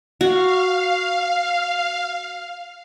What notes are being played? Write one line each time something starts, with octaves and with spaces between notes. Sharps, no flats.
F#4 F5